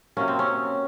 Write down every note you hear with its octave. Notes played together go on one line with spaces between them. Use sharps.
C3 F#3 A#3 C#4
C4
C#4